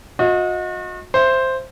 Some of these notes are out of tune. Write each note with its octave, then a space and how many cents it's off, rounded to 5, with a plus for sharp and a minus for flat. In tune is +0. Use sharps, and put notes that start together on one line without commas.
F#4 -40 D#5 +15
C5 +0 E5 +20